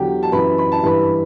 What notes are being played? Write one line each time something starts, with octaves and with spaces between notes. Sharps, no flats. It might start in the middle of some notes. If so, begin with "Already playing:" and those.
Already playing: E2 D3 F#3 G4 G5
A5
F#2 E3 B4 B5
B5
A5
G2 E3 B4 B5